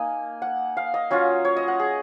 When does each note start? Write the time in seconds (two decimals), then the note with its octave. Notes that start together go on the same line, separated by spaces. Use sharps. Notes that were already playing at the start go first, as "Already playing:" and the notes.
Already playing: A#3 D#4 G#5
0.42 F#5
0.77 F5
0.94 D#5
1.11 F#3 C#4 F4
1.45 C#5
1.57 D#5
1.68 F#5
1.79 G#4